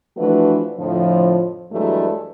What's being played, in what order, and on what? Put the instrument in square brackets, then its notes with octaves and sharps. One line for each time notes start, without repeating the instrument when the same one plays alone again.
[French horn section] E3 F3 A3 D4 F#4 B4
F2 A2 D3 F3
G2 E3 F#3 G#3 A3